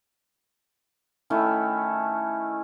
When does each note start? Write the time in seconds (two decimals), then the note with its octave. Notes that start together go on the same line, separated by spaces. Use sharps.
1.30 D#3 A3 C#4 E4